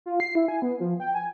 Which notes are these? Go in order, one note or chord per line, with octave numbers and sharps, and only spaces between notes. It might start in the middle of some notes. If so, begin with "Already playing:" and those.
F4
C7
E4
G#5
B3
F3
G5
G#5